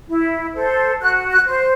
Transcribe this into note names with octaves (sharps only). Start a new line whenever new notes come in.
E4
A4 C5
F#4 F#6
F#6
C5